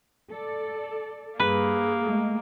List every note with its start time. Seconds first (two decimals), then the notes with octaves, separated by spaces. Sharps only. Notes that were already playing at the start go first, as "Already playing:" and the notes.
0.30 A4 D5
1.40 G2 A#3 G#4 B4
2.01 G#3 A3